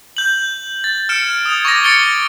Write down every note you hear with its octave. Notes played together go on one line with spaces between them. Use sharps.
G6 F#7
A6
F6 G#6 C#7 D7 E7
D#6 G#6
C#6 D6 A6 A#6
G#6 A6 C#7 D7 G7